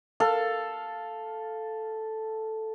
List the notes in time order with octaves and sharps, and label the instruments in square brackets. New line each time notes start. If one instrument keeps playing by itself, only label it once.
[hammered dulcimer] A4 F5